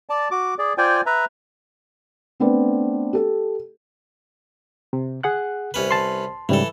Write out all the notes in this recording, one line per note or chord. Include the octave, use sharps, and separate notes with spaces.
D5 A5
F#4 D6
G#4 D5
F4 C5 D5 G5 G#5
B4 E5 A#5
A3 B3 C4 D4 B4
G4 A4
C3
G#4 F#5 F#6
C2 C#4 B4
A5 C6
G#2 C#3 E3 G3 A4